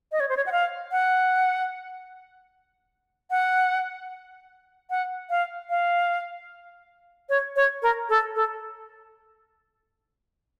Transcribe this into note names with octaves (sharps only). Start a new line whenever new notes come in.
D#5
C#5
C5
C#5
F#5
F5
F#5
F#5
F#5
F5
F5
C#5
C#5
A#4
A4
A4